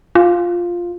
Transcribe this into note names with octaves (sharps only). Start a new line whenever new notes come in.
F4